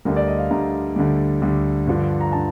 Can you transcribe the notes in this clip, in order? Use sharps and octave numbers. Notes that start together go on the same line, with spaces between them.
D2 D3 G3 A#4
D5
D#5
F5
D2 D3 G3 A#5
D2 D3 G3
D2 D3 G3
G2 D3 F3
A#5
D3 A5